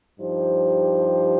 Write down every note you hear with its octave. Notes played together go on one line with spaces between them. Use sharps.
G2 F3 D#4 G4 C5